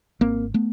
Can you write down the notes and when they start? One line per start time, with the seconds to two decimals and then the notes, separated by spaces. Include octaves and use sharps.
0.21 G#1 A#3 C4
0.54 A3 B3